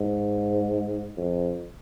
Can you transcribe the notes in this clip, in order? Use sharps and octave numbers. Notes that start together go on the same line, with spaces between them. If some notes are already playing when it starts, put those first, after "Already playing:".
Already playing: G#2
F2